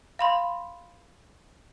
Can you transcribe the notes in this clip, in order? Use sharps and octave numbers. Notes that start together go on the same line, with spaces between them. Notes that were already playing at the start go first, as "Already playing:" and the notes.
F5 B5 C6